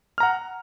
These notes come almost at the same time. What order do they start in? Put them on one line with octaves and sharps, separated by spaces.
F6 A#5 F#5